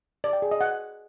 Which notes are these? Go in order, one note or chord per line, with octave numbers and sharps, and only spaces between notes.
D5
G5
G#4
D#5
F#5